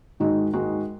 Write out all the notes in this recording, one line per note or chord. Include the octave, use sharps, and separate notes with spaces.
G#2 D#3 G#3 D#4 F#4
G#2 D#3 G#3 D#4 F#4